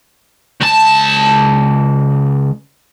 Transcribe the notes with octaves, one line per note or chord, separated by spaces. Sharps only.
C#2 A5